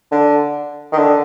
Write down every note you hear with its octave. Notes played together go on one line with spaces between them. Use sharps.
D3
D#3
D3